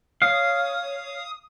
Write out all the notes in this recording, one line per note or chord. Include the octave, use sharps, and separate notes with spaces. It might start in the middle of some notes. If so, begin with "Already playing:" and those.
C#5 F5 D#6